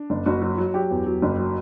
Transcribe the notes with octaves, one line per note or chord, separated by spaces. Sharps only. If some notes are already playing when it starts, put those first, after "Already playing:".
Already playing: D4
F#1
F#1 F#4
F#3
F#3
F#3 G4
E2
F#3
F#1
F#3